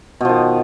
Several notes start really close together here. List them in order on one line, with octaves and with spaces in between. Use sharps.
B2 F3 D#3